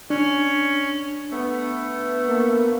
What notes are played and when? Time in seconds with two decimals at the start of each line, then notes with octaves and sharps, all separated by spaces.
0.10 C#4 D4
1.32 A3 B3
2.27 A#3